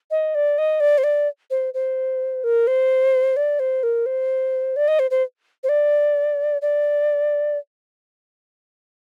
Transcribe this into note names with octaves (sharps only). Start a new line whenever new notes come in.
D#5
D5
D#5
D5
C5
D5
C5
C5
A#4
C5
D5
C5
A#4
C5
D5
D#5
C5
C5
C5
D5
D5